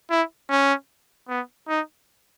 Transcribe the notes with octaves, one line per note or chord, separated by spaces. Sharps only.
E4
C#4
B3
D#4